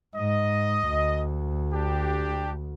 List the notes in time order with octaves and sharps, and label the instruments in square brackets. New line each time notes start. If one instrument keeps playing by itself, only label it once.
[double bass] G#2 [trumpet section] D#5
[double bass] D2
[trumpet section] D4 G4